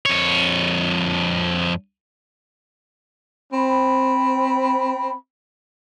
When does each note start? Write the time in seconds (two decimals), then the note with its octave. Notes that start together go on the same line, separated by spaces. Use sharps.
0.06 F2 C#5
3.53 C4 B5